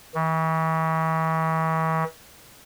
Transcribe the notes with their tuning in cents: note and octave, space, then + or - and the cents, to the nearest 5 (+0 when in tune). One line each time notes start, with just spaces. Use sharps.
E3 -40